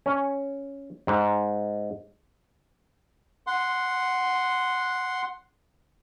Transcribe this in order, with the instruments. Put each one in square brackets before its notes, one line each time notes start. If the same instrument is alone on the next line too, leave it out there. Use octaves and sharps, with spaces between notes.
[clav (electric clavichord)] C#4
G#2
[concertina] F#5 C6